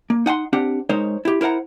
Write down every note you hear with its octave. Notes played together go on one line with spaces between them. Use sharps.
A#3
D#4 F#5 G#5 C6
C4 D4 G4 F#5
G#3 D#4 A#4 C5 C#5
E4 G4
E4 A#4 C5 F#5 A#5